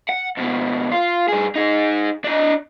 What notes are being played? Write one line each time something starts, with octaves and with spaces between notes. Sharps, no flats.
F#5
F2 B2
F4
G2 G#4
D#4 G#4
D4 D#5